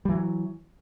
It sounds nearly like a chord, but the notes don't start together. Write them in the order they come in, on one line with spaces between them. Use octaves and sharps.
G3 E3 F#3